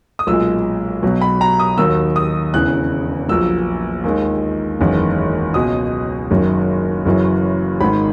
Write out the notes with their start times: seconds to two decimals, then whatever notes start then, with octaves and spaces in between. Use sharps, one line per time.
0.19 D#6
0.27 B1 A#2 G#3 E6
1.03 B1 B2 F#3
1.21 B5
1.41 A#5
1.59 D#6
1.78 D#2 D#3 F#3 E6
2.16 D#6
2.53 E1 E2 C#3 E3 F#6
3.28 A#1 A#2 F#3 E6
4.04 D#2 D#3 G#3
4.79 F#1 E2 D#3 G#3
5.54 C#2 B2 G#3 D#6
6.31 F#1 F#2 D#3
7.06 F#1 F#2 C#3 E3
7.81 G#1 G#2 D#3 B5